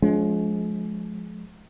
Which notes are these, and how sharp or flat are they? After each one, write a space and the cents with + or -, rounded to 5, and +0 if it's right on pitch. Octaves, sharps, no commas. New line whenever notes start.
F3 +20 G#3 +30 D4 -40